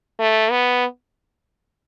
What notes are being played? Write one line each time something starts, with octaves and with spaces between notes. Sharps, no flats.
A3
B3